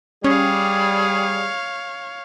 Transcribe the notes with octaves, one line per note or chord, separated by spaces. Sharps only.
G3 C#4 G#4 C#5 F5